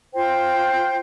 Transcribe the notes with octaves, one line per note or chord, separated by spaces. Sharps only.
F4 C5 G5